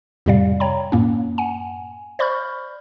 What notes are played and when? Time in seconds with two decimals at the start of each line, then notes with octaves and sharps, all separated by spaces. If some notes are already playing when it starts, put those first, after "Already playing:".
0.26 F2 A2 C3 G3 D5 F5
0.60 C#5 G5 A#5 B5
0.92 F#2 A2 A#3 C#4
1.38 F#5 G#5
2.19 C5 D5 B5 C#6 F6 G6